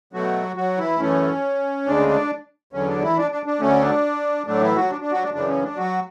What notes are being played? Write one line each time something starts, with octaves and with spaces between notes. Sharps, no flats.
B2 F#3 A3 F#4
F#3 F#4
E3 E4
F#2 E3 A3 C#4
D2 C#3 G#3 D4
D4
E2 D3 F#3 C#4
D4
E3 E4
D4
D4
D4
D2 D3 F#3 A3 C#4
D4
A2 F#3 A3 D4
E3 E4
F#3 F#4
D4
D4
F#3 F#4
D4
F#2 C#3 E3 D4
C#4
D4
F#3 F#4